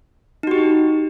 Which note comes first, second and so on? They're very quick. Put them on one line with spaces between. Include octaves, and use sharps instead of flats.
D#4 F#4 G4